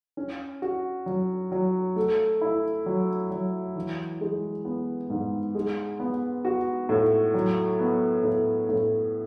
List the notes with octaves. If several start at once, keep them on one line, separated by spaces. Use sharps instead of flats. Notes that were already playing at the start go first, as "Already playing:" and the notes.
C#4
F#4
F#3
F#3
A3
E4
F#3
F#3
E3
G#3
B3
G#2
G#3
B3
F#4
A2
F#3
B3
A2
A2